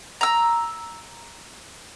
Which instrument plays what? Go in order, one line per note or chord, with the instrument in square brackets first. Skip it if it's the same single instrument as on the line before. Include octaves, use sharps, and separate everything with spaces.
[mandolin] A#5 E6